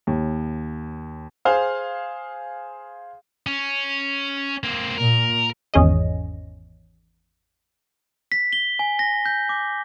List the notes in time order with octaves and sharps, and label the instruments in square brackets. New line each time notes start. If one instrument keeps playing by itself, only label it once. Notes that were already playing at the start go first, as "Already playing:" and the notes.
[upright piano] D#2
[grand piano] G#4 C5 F5
[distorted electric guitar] C#4
A#3 C4
[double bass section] A#2 [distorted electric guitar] A#4
[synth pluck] G#1 E2 C#4 G#4 D#5
[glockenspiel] B6
G7
G#5
A#6
G6
D6